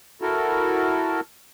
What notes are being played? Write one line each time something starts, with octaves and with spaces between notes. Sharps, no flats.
E4 F#4 A4 A#4